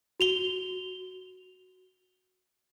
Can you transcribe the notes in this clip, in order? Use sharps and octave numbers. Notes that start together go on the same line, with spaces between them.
F#4 F7 G7